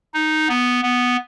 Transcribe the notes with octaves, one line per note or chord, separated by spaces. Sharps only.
D#4
B3
B3